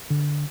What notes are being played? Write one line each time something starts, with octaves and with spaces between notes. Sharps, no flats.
D3